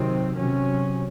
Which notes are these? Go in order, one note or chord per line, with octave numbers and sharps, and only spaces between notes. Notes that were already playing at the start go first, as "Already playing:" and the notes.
Already playing: C3 D#3 F#3 C4
C3 F#3 C#4